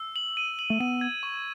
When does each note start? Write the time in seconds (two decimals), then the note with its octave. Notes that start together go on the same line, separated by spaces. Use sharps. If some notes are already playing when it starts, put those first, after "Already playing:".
Already playing: E6
0.16 F#7
0.37 D#7
0.59 F#7
0.70 A3
0.80 B3 D#7
1.01 G#6
1.23 C#6